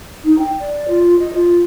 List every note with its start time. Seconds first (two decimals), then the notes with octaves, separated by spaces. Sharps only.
0.24 D#4
0.38 G5
0.60 D5
0.88 F4
1.19 D#5
1.33 F4